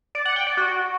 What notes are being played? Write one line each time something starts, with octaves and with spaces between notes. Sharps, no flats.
D5
F#5
G5
D5
F#4